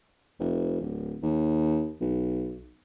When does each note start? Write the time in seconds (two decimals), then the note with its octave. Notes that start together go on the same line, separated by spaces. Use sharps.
0.39 F1
0.81 D1
1.23 D#2
2.01 B1